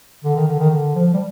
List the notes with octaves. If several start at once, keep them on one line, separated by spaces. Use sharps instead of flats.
D3
D#3
D3
D#3
D3
F3
G3